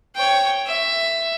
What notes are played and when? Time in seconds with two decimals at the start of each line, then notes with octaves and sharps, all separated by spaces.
0.15 C#5 G5
0.66 E5